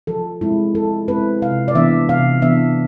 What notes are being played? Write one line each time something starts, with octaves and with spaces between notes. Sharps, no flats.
F3 A4
G#3 C4 E4
F3 A4
G#3 C4 E4 B4
C3 F5
D5
E3 B3 D4 E5
C3 F5
E3 B3 D4 E5